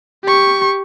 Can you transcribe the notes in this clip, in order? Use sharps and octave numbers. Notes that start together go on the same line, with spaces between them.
G4 C#6